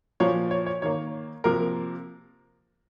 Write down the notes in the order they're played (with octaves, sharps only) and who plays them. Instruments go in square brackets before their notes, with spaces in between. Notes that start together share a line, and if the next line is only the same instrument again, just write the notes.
[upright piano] A#2 F3 A#3 C#5
C#5
C#5
D#3 A#3 C#5
C3 F3 A#3 A#4